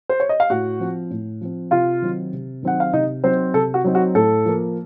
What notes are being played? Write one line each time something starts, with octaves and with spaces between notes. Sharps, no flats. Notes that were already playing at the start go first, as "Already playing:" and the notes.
C5
C#5
D#5
F5
A2 F#4 F#5
F3 C4
A2
F3 C4
C3 F4 F5
D#3 F#3 C4 D#4
C3
D#3 F#3 C4 D#4 F#5
F5
C3 D#4 D#5
F#3 C4 D#4 C5
C3 A4
F#4
F#3 C4 D#4
F#4
A2 A4
F3 A#3